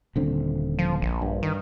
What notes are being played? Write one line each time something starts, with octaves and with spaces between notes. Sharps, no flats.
D#1 D3 C4
F3
A#1
G2
D#3